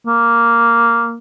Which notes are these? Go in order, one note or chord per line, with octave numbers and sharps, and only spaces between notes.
A#3